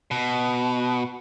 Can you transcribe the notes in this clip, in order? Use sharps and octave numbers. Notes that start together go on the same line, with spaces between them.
B2